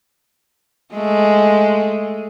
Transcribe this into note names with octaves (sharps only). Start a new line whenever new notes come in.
G#3 A3